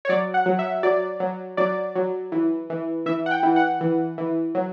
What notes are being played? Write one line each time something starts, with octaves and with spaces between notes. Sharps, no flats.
C#5
F#3 D5
F#5
F#3
E5
F#3 D5
F#3
F#3 D5
F#3
E3
E3
E3 E5
F#5
G5
E3
F#5
E3
E3
F#3